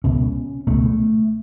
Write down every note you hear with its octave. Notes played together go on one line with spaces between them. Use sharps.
C#2 B2 C#4
C#2 B2 A3